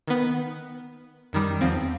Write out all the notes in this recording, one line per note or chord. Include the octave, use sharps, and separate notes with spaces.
D#3 B3
F#2 D#3 G3
E2 F3 C4